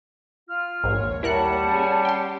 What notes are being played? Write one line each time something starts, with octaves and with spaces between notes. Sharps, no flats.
F4 F6
A#1 D#2 G#2 C#5
G3 E4 A#4 F#5 A5 F#6
C#4 G#4
G4 G5 C6